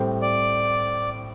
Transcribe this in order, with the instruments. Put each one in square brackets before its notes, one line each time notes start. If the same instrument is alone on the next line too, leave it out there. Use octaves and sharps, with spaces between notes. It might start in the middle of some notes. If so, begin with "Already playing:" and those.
Already playing: [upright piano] A2 G3 C4 G4 C5
[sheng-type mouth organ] D5